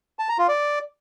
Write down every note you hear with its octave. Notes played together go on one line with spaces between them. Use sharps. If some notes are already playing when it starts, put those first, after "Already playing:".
A5
A#5
F4
D5